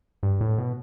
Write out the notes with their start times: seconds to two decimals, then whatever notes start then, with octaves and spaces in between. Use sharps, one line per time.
0.23 G2
0.41 A2
0.58 B2